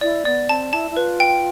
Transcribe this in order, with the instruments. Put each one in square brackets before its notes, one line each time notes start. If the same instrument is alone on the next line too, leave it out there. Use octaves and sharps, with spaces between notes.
[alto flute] E4 [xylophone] D5
[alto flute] B3 [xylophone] D5
[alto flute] C4 [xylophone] A5
[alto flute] E4 [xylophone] A5
[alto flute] E4
[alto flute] F4 [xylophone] B4
[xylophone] G5